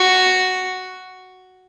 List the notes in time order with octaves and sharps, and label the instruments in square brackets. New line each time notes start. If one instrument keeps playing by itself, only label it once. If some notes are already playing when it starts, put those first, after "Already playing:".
Already playing: [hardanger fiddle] F#4